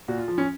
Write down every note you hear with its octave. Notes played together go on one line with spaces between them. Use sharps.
A#2 F#4
F4
F3
C#4